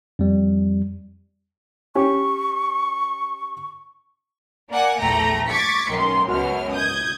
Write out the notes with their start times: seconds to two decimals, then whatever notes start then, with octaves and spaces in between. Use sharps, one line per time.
0.19 F2 G3
1.95 C#4 G4 C#6
4.70 A#3 D5 F#5 G#5
4.99 A#1 E2 A3 G5 A#5 A#6
5.47 C#6 D6 G#6 A6 B6 C#7
5.90 B1 F#2 D#3 C6
6.29 C#2 F#2 B2 F#4 F6
6.73 D#6 G6 G#6